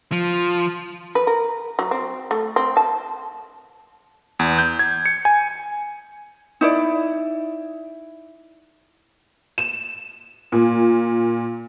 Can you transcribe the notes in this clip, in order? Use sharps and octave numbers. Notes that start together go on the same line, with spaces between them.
F3
B4
A#4
F#3
C4
A3
C4
A5
E2
G6
G#6
C#7
G#5
D#4 E4 D5
E7
A#2